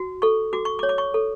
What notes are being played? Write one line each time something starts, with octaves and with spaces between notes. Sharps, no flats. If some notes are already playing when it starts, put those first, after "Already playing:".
Already playing: F#4
A4 C#6
F#4 D6
C#6
D6
C#5
D6
C#6
A4